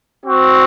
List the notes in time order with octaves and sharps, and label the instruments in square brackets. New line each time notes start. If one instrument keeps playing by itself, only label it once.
[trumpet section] C4 F#4